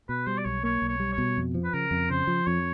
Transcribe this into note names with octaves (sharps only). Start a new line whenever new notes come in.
B2 B4
G3 C5
D5
B1 C#5
A#3 C#5
B1
C#5
G3
C#5
B2
F2
F3
B4
C#3 A#4
F2
C#3 C5
F3
F2 C#5